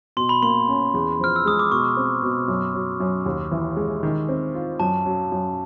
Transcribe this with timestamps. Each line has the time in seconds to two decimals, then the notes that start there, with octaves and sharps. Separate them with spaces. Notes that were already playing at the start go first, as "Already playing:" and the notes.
0.17 B2 C6
0.29 B5
0.42 A#3 C6
0.68 C#4
0.94 E2
1.20 F3 F6
1.36 E6
1.45 G#3 D#6
1.59 D6
1.71 B2 C#6
1.97 C4
2.23 B2
2.48 F#2
2.74 F#3
3.00 F#2
3.26 D#2
3.51 E3
3.77 G#3
4.03 D#3
4.29 C4
4.55 F4
4.80 F#2 A5
5.06 F#3
5.31 F#2